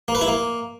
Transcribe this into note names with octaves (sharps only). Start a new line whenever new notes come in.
A#3
B4
E4
A#3